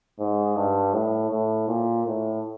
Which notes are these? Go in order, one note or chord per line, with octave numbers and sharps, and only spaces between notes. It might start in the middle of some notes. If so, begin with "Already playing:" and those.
G#2
G2
A2
A2
A#2
A2